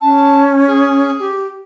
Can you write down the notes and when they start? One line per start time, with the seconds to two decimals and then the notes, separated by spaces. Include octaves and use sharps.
0.01 C#4 A5
0.67 G#4
1.19 G4